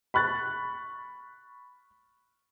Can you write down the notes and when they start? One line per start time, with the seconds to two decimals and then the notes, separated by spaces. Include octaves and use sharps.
0.14 B5 C#6 F#6 A6